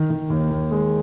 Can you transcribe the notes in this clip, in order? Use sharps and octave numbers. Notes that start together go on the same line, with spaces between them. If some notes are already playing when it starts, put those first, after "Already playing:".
Already playing: D#3
D#3
D#2
D#2
G#3